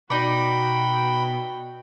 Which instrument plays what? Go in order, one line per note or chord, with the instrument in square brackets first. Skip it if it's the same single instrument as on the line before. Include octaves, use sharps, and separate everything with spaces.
[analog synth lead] B2 [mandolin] D#4 D5 [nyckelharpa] F#4 G5 [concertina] B5